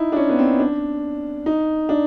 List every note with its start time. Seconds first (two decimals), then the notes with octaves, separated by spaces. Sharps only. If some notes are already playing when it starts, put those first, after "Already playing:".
Already playing: D#4 E4
0.12 D4
0.16 C#4
0.29 B3
0.39 C4
0.60 D4
1.46 D#4
1.89 D4